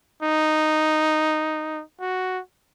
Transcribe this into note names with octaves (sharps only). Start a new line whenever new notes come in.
D#4
F#4